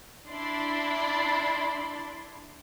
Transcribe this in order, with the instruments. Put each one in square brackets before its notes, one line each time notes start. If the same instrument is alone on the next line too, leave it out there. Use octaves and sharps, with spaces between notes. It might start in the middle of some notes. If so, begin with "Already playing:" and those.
[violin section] D4 E4 D5 C6